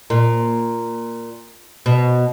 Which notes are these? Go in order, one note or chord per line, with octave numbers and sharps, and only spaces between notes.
A#2
B2